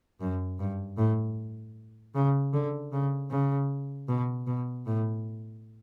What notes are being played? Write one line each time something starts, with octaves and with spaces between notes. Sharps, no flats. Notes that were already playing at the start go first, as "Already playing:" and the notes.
F#2
G2
A2
C#3
D3
C#3
C#3
B2
B2
A2